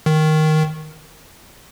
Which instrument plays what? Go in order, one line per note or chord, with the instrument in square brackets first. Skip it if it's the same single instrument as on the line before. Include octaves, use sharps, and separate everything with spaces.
[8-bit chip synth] D#3